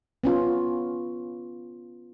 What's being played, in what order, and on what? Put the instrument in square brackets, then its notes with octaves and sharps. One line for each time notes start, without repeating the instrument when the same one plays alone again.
[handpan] B3 C#4 F4